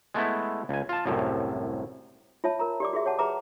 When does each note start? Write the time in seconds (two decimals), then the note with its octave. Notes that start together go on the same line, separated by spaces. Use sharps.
0.14 G#3 A3 B3 E4
0.69 C#2 G#5
0.89 F4 A5
1.06 C2 F#2 A2 C3
2.44 F4 C#5 E5 A5
2.59 A#4 A#5
2.80 G4 D5 D6
2.93 F#4 G#4 E5
3.06 C#5 F#5 A5
3.19 G#4 B4 E5 A#5 D6